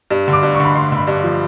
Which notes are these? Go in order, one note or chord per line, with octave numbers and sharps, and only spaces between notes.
G2
D3
D6
G2
C#6
D3 B5
G2 C6
D3 B5
G2
F3